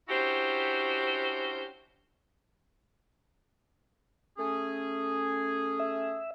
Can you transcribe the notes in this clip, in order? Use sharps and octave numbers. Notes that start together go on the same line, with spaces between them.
C#4 D4 E4 F#4 G4 C5
A3 C#4 G#4
E5